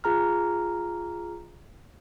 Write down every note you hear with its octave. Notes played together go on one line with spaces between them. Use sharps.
F4 G#4 A#5 F6